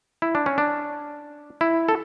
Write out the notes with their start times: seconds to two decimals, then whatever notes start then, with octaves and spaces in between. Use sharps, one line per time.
0.22 E4
0.35 D4
0.46 C#4
0.58 D4
1.61 E4
1.89 A4